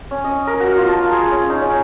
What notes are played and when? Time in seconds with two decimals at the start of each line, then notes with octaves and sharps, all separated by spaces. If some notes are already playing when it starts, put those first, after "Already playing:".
0.11 C#4
0.24 D#5
0.47 A#4
0.60 F#4
0.77 F4
0.88 A5
1.12 G#4
1.31 C#4
1.50 D#4
1.61 C#4